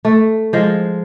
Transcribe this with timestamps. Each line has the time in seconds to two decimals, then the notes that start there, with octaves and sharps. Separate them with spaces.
0.05 A3
0.53 F3 G#3